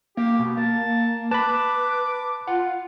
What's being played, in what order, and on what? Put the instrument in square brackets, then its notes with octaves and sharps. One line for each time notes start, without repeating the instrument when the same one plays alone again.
[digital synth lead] A#3 [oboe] G4
[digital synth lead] B2
[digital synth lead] A#3 [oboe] A5
[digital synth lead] B4 [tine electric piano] A5 B5 [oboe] D6
[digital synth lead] F4 [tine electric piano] F#5